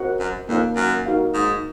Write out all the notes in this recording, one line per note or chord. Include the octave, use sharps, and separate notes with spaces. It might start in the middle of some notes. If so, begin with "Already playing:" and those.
Already playing: C4 F#4 A#4 D#5 F#5
F#2
F2 A#3 D#4 A#4 C#5 F5
F#2
D#4 F#4 A#4 F5
G#2